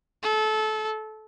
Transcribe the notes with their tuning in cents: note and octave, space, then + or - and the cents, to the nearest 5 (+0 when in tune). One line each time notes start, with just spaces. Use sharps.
A4 -25